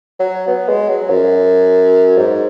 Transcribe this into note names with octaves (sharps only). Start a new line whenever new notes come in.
F#3
B3
G#3
F#3
F#2
G#2